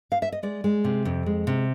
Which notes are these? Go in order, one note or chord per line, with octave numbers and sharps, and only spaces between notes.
F5
E5
D#5
G#3 D5
G#3
C3
F2
G#3
C3